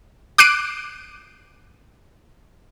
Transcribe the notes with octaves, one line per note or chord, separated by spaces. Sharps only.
D6 F#6 C7 D7 D#7